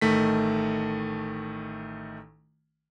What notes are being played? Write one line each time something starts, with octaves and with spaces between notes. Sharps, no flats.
A1 D#3 A3 B6